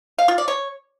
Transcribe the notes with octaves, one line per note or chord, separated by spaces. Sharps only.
F5
F4
D5
C#5